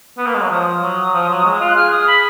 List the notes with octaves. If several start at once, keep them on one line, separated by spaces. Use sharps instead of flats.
B3
A#3
G#3
F#3
F3 D#6
F#3
F3
F#3
G#3
F4
F#6
G#4 F6
D#6
B5